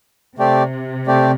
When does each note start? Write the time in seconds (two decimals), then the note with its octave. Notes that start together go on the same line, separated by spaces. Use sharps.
0.38 C3 A3 C4 G4 D5
1.07 A3 C4 G4 D5